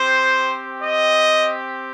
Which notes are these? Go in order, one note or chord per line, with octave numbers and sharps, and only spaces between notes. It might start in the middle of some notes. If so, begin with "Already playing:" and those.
Already playing: C4 G4 C5
D#5